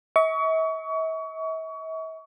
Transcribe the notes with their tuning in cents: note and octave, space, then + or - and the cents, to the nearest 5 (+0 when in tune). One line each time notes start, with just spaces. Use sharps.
E5 -45 C#6 +30